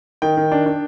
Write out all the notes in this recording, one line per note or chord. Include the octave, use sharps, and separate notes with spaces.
D#3 G5
D#3
D4
D4